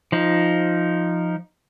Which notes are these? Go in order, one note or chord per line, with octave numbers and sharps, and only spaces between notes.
F3 D#4